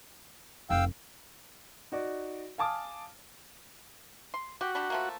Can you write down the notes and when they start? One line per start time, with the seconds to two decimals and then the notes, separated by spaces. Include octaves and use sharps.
0.70 F1 F5 G5 E6
1.92 D#4 F#4 D5
2.58 F5 G#5 A5 D6 D#6 F6
4.34 C6
4.61 F#4 G4
4.75 G3 D4 G4
4.90 F3 A3 A#3